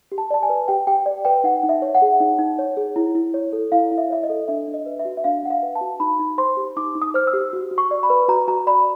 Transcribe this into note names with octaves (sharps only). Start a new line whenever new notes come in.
G4
A5
D5 A5
G#5
B4
G4 G5
G4 G5
D5
B4 G5
D#4 F#5
D#4
E5
C#5
F#5
G#4
D#4
D#4
C#5
G#4
E4
E4
C#5
A4
E4 F5
E4
E5
C#5 E5
D#5
A4
D4 E5
D4
D#5
B4
E5
F#4
E5
D4 F5
D4 F#5
F5
B4
A5
F#4
D#4 B5
D#4
C5 C6
G4
D#4 D6
D#4
D#6
C5 F6
E6
G4
F#4
F#4
C#6
D5
B5
B4
F#4 A#5
F#4 A#5
D5 B5